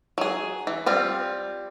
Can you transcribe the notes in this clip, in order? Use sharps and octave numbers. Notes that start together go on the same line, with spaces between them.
F#3 G#4
E3
G3 C4 F4